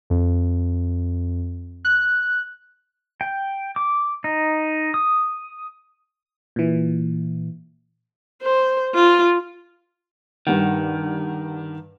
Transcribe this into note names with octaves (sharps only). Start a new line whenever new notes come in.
F2
F#6
G5
D6
D#4
D#6
A#2 E3
C5
F4
G2 D#3 G3 F#5